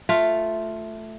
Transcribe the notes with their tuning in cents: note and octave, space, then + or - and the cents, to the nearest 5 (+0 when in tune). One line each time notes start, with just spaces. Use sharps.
A3 +0 F4 +0